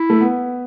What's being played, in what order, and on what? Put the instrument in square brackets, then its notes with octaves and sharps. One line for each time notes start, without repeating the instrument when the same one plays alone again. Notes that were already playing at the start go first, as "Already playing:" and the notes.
Already playing: [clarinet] E4
[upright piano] A3
B3